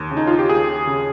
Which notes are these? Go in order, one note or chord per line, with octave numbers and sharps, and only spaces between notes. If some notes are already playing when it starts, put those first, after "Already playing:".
Already playing: D#2
C#3
D#4
F4
G4
D#2 G#4
C#3